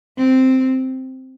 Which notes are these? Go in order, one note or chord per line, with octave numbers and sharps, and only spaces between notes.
C4